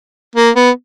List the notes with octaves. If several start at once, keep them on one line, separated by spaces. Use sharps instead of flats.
A#3
B3